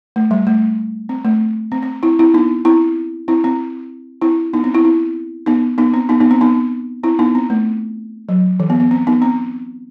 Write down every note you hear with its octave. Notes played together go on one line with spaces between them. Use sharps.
A3
G3
A3
C4
A3
C4
C4
C4 E4
C4 E4
B3 D#4
C4 E4
C4 E4
C4
C4 E4
B3 D#4
C4
C4 E4
C4 E4
B3 D#4
B3 D#4
C4
B3 D#4
B3 D#4
C4
B3 D#4
C4 E4
B3 D#4
C4
A3
F#3
E3
B3
B3
C4
B3 D#4
C4